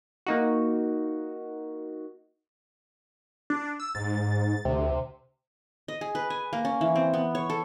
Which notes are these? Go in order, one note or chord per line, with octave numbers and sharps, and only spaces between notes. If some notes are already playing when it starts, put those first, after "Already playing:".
A#3 D#4 F#4
D4
E6
G#2 A6
D2 C3
D#5
G#4
B4
G#5
A#3
C#4
E3
C4
B3
C#5
A4